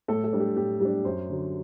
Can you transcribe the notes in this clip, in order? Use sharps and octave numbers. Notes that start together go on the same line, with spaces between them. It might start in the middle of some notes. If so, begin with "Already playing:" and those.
A2 A4
A4
G3 D4
G4
A2 G4
G3 D4 G4
F#2 C5
D3 F#3